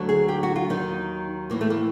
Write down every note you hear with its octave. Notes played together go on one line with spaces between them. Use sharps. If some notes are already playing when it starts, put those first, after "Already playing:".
Already playing: D2 D3 F#3
G#4
G4
F#4
F4
D#2 D#3 F#3 D#4
A2 E3 A#3
A3
A#3